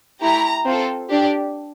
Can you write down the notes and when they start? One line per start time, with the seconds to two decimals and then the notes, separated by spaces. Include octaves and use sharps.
0.21 A3 E4 G4 A#5
0.65 C4 F4 A4
1.09 D4 G4